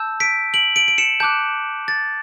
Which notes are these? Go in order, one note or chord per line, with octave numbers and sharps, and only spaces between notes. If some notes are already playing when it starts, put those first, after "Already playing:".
Already playing: A5 E6 G6
B6 D7
D7 F#7
D7 F#7
D7
C#7 E7
A5 D6 F#6 G6
A6